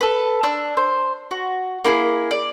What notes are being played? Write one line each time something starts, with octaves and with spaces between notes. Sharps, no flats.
A4 B4
D4 E6
C5
F#4
A#3 E4 F4 G#4
D5